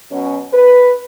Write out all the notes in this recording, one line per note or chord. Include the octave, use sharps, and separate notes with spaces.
B2 F#3 C#4
B4